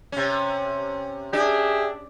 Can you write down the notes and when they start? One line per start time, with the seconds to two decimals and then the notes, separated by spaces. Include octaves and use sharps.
0.12 C3 C#4
1.33 D4 G4 G#4 E5